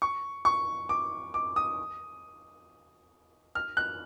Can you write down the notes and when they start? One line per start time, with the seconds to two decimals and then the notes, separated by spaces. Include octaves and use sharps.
0.02 C#6
0.45 C#6
0.89 D6
1.34 D6
1.56 D#6
3.55 F6
3.77 F#6